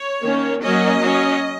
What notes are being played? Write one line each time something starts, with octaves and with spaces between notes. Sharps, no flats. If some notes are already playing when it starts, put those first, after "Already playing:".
Already playing: C#5
D#3 A#3 C#4
F#3 A#3 C#4 D#5
F#3 C#4